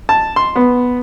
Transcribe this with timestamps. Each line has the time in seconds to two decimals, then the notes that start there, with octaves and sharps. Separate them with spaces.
0.09 A5
0.36 C6
0.56 B3